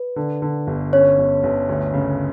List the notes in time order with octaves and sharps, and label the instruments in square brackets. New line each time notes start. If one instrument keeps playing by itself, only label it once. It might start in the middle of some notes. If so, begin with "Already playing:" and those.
Already playing: [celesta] B4
[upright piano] D3
D3
G1
[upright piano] C#4 [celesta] C#5
[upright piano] G1
G1
D2
C#3